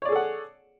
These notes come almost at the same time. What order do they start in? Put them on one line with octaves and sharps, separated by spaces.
C#5 D5 G#4 A4 F#5